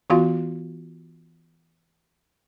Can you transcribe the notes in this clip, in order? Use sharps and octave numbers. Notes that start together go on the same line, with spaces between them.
E3 B3 F4 F#4 F5 C6